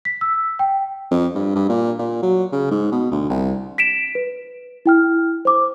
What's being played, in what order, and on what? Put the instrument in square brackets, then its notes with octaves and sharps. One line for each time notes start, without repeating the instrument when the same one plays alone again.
[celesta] B6
E6
G5
[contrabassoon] F2
G2
G2
A#2
A#2
F#3
C#3
G#2
B2
D2
C2
[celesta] B6 D7 E7
B4
E4 G5 F6
C5 D6